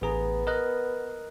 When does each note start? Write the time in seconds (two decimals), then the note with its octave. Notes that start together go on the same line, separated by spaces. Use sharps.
0.02 A1 B3 G#4 A#5
0.47 A#4 D#5 F#6